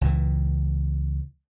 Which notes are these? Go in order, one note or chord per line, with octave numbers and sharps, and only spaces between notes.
C#2 A#2 E3